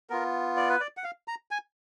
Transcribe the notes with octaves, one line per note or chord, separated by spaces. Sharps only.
B3 F4 A#4
D5
B4
D5
F#5
F5
A#5
G#5